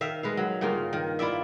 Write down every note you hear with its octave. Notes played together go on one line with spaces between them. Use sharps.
D#3 E5 F5
G#3 B4 F5
F#3
G2 C#3 A#3 F4
D#3
E4 F4 D5 E5